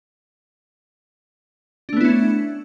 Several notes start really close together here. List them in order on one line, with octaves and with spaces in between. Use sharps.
D4 A3 B3 E4 C#4